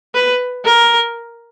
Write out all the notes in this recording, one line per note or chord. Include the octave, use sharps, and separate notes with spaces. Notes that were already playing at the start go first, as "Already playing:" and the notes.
B4
A#4